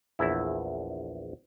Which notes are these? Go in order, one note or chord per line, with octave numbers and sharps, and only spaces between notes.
A#1 E2 E4